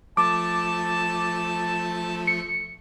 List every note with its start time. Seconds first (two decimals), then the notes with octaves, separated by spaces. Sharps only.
0.17 F3 A3 A5 D6
2.27 C#7